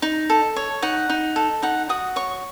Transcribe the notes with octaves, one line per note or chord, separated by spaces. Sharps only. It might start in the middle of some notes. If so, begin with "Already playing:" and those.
D#4
A4
C#5
D#4 F#5
D#4
A4
D#4 F#5
F#4 D#6
C#5 C#6